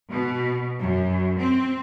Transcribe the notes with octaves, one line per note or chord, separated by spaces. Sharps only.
B2
F#2
C4